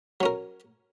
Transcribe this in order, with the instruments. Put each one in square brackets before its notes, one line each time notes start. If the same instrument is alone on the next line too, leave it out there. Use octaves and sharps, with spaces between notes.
[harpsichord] F#3
C#4
A#4